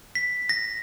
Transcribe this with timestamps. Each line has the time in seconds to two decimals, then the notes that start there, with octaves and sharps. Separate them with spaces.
0.15 B6
0.49 A#6